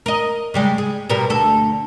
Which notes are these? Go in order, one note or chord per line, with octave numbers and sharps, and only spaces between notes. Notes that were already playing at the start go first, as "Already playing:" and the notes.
A#4 D#5
C#3 G3 G#3
G#4
B2 G3 A#4
D2 A4